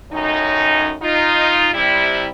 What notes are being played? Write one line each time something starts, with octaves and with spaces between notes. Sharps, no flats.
F#2 A2 C#4 D#4
D#4 F4
C3 G3 E4